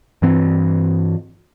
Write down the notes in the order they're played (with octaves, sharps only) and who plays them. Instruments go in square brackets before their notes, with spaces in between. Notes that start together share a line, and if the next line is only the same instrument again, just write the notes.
[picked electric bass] G2 E3 C4